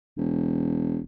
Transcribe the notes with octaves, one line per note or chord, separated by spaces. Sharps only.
E1